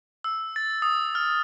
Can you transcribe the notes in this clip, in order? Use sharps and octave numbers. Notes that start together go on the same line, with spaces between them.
E6
A6
D#6
F6